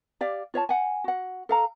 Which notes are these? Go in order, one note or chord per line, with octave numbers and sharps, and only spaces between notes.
G4 D5 F5
F4 C#5 E5 A5
F#5 G#5
F#4 F#5
A4 F5 A#5